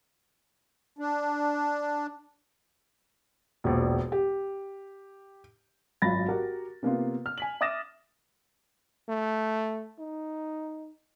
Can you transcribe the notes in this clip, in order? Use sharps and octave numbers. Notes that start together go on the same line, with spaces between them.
D4
E1 A#1
G4
G#1 F#2 F4 B5 A6 A#6
F#4 G4 A#4
C3 A#3 B3 F4
F6
G#5 B6 F#7
E5 D6 D#6 A6 A#6 E7
A3
D#4